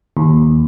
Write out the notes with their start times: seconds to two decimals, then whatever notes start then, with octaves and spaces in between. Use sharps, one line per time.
0.17 D#2